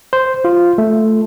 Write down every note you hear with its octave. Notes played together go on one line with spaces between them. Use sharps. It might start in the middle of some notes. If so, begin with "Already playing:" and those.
C5
F4
A3